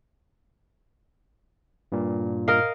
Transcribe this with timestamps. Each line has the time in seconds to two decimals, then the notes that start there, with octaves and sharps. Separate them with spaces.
1.92 G2 A#2
2.48 A#4 D#5 F5